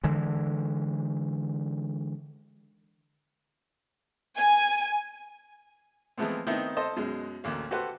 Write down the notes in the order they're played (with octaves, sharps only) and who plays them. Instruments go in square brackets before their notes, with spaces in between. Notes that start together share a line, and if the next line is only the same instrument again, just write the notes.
[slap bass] D3 E3 G#3
[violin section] G#5
[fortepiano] E3 F3 G#3 A3 B3 C4
D#3 A3 B3 C4 D#4 E4
A4 C5 D#5 A5
F#2 B2 G#3
A1 D2 A#3
F#4 G4 A4 B4 C5 F#5